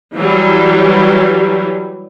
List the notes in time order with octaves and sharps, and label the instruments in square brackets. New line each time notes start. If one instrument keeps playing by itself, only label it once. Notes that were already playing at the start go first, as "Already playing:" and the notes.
[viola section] E3 F#3 G3